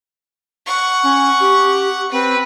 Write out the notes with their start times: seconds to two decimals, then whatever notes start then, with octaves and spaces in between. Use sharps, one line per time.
0.66 F#5 C#6
1.03 C#4
1.41 G4
2.12 C4 B4